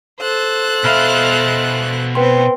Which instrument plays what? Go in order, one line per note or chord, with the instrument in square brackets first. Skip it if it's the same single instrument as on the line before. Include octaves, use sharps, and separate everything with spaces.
[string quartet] A4 C5 F#6
[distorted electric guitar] B2 F5 [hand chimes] E5 B5 F6
[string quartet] B3 C4 [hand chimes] B4 G5 C6